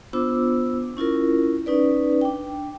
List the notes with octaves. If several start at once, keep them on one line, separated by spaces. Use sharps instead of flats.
B3 D4 F4 C5 D6 E6
C#4 E4 F4 A#4
C#4 D#4 B4 D5
D4 G5